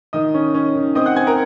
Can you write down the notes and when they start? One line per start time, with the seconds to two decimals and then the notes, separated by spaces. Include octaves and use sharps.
0.13 D#3 D#5 D#6
0.34 C#4
0.54 C#4
0.75 D#3
0.95 C4 D#5 D#6
1.06 F#5 F#6
1.16 C4 G#5 G#6
1.27 A#4 A#5